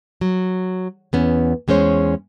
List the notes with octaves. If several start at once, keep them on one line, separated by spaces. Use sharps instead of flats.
F#3
E2 B3 C#4
E2 G#3 C#4 C5 C#5